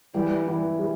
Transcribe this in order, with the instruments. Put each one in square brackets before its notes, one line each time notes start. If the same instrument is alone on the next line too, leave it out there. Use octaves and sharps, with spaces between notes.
[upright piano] E3 [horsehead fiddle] G3
[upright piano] E3
G3